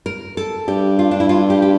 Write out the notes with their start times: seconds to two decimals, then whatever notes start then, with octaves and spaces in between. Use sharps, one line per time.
0.06 A#4
0.37 A4
0.68 G2 G4
0.99 F4
1.11 D4
1.20 E4
1.29 F4
1.50 G4
1.62 G4